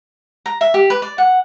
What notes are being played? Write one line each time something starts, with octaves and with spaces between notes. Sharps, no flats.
A#5
E5
G4
B4
D5
F#5